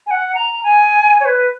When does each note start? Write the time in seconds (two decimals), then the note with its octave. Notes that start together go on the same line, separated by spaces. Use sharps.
0.07 G#5
0.11 F#5
0.35 A#5
0.64 G#5
1.20 C#5
1.25 B4